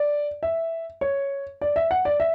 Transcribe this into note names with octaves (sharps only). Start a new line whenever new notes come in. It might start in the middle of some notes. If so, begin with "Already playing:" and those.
Already playing: D5
E5
C#5
D5
E5
F#5
D5
E5